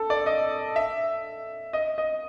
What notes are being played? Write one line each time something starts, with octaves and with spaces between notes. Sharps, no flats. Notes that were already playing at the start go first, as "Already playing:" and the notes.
Already playing: A4
D5
D#5
E5
D#5
D#5